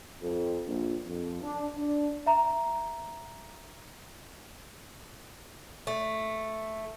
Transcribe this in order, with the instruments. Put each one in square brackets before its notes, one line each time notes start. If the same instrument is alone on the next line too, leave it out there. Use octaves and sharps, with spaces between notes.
[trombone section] F2
A#1
F2
D4
D4
[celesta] E5 A#5
[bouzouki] A3